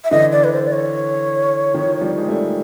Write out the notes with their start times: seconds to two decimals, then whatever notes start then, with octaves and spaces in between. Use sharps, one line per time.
0.04 E5
0.11 D3 E3 D#5
0.32 D5
0.44 B4
0.53 C5
0.67 D5
0.73 C#5
1.74 D#3 F3
2.01 F3 G3
2.18 G#3
2.28 G3 A3